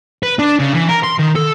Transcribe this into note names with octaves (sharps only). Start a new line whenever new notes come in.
B4
D4
C#3
E3
A#4
C6
D#3
A4